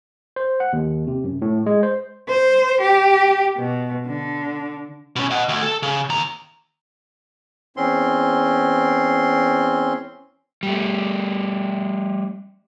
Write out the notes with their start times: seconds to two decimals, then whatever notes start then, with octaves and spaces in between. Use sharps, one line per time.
0.36 C5
0.60 F#5
0.73 D#2
1.07 C3
1.24 F#2
1.42 A2
1.66 G#3
1.83 C5
2.28 C5
2.81 G4
3.58 B2
4.06 D3
5.16 B2 C#4
5.31 D#5 F#5
5.49 D2
5.63 A4
5.83 C#3
6.09 D#2 A#5
7.77 E2 C4 C#4 C6
10.63 G3 A3